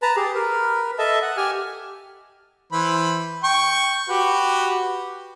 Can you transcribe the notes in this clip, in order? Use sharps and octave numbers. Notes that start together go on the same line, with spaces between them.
B4 A5 A#5
G4 G#4
A#4 B4
A4 D#5 E5 A5
F#5
G4 G#5 F6
E3 C5 B5
G5 C#6
F#4 G4 B4